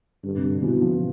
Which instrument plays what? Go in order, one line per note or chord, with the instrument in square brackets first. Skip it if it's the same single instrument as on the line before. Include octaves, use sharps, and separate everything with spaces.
[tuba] G2 [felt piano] D3
[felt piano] C3
D3
[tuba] B2 [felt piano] E3
[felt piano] F3